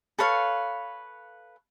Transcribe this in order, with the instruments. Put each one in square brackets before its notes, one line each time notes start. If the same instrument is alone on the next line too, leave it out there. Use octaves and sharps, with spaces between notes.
[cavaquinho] A4 B4 C#5 F5